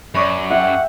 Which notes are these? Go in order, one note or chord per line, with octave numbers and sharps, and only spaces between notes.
F#2 B4 C#5 D5
E5 F#5 G5